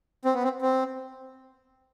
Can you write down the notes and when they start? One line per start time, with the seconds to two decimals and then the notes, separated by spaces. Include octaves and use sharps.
0.25 C4
0.34 B3
0.43 C4
0.62 C4